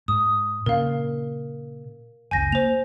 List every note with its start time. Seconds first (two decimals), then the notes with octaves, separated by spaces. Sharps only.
0.08 G#2 D#6
0.66 A#2 C#3 A#4 F5
2.31 F#1 C#2 G#5 G6 A#6
2.52 A#3 C5 F7